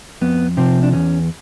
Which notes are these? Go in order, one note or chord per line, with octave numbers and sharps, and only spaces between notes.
F2 B3
C3 F3 C4
D4
E2 C#4